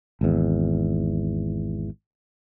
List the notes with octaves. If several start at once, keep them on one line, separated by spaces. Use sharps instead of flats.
G#1 E2